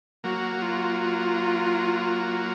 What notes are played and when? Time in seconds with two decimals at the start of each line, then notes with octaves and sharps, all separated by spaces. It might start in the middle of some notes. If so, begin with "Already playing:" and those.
0.24 F#3 A#3 F#4
0.61 F4